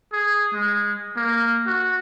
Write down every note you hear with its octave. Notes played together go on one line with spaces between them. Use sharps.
G#4
G#3
A#3
F#4